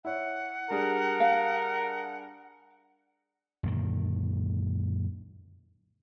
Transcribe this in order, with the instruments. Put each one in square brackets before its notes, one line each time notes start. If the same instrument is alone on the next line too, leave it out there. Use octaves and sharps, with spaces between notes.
[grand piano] E4 C#5 [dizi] F#5
[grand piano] G3 D4 G#4 [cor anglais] A#4
[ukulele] F5
[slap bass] F#2 A#2 D3 D#3